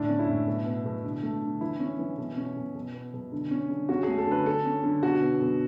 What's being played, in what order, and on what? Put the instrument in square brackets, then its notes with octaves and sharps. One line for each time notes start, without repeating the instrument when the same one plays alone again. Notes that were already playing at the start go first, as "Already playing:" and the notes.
Already playing: [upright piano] A2 D3 D4
C#4
E4
A2
B2
B3
B2
D3
A3
D3
E3 E4
C#4
E3
B2
C#4
B2
B2
B3
B2
D3
C#4
D3
C#4 F#4
G#4
A3
A4
D3 B4
D3 A4
C#4
D3
B2 F#4
B3
B2